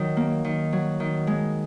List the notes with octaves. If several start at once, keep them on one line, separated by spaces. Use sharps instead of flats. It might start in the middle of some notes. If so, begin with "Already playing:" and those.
Already playing: D#3 F#3
A#3
D#3
F#3
D#3
G#3